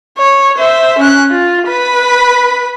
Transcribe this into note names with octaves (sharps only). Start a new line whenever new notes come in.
C#5
C5 E5
C#4 F#6
F4
B4 B5